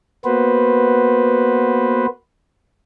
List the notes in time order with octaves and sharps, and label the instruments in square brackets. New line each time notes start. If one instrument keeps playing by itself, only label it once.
[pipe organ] A#3 B3 F#4 B4 C5